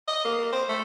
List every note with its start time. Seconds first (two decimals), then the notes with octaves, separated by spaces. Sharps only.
0.08 D#5
0.25 A#3
0.38 A#3
0.53 C5
0.69 A3